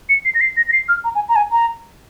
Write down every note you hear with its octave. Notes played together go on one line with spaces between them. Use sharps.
C#7
C7
A#6
C7
A#6
A#6
C7
F6
A#5
G#5
A#5
G#5
A#5